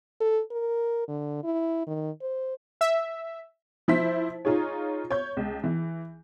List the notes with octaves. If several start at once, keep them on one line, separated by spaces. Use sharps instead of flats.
A4
A#4
D3
E4
D#3
C5
E5
F3 E4 C5 B6
D#4 F4 G#4 C#5
C#5 G6
C#2
E3